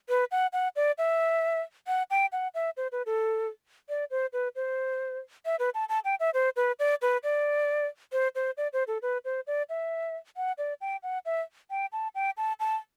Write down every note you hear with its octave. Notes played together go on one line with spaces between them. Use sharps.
B4
F#5
F#5
D5
E5
F#5
G5
F#5
E5
C5
B4
A4
D5
C5
B4
C5
E5
B4
A5
A5
G5
E5
C5
B4
D5
B4
D5
C5
C5
D5
C5
A4
B4
C5
D5
E5
F#5
D5
G5
F#5
E5
G5
A5
G5
A5
A5